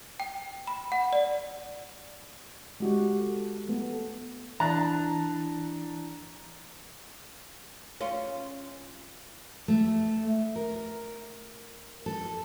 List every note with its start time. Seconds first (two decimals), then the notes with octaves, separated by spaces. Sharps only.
0.20 G5
0.67 B5
0.92 F#5
1.13 D5
2.80 G#3 F#4 G4
3.18 A4
3.69 A3 B3
4.60 E3 D4 A5 A#5 F#6 A6
8.01 C#4 F4
9.68 A3
10.56 A#4
12.06 A4